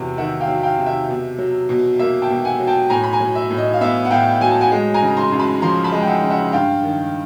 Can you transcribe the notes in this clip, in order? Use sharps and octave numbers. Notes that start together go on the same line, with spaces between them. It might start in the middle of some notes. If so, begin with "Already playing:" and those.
Already playing: E2 C3 F#3
D#3 E5 F#5
F5 G5
F#3
F5 G5
C3
E5
B2
F#3
B2
A#3 E5
G5 A5
B2
F#5 G#5
F#3
G5 A5
A2 G#5 A#5
B5
G#5 A#5
F#3
E5
A2
D#5
F5
B3 E5
F#5
A2 F5 G5
F#3 G#5
A5
F#5 G#5
G#3
G#5 A#5
C#3
A#5 C6
F#2
A5 B5
F3 A#5 C6
A5 B5
G#3
G5
E5 F#5
C#3
E5 F#5
G2 F5 G5
D#3